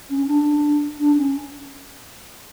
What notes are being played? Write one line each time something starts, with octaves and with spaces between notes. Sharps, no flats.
C#4
D4
D4
C#4